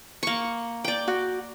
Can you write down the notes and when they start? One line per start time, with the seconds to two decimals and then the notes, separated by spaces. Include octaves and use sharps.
0.23 A#3 C#6
0.84 D5 G5
1.08 F#4